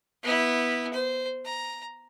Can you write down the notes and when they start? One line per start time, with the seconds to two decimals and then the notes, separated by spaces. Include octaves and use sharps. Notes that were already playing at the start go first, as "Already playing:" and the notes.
0.23 B3 E4
0.93 C5
1.45 A#5